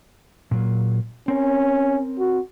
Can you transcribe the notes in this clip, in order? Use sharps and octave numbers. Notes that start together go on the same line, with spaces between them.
A#2 F#3 A#3
C4 C#4 A#4 C#5
F#4